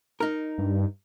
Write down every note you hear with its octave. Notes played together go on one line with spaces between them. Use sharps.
D#4 A#4
G2